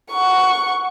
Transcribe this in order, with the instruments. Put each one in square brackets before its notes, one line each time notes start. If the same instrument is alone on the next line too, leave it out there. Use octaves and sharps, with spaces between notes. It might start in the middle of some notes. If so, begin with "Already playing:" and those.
[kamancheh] F#5 C#6